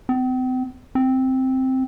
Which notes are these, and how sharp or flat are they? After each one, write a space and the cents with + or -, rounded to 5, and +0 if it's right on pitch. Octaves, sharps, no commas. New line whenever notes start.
C4 -40
C4 +0